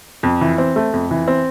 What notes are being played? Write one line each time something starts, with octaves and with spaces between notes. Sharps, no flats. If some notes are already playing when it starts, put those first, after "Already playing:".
F2
E3
C4
A3
F2
E3
C4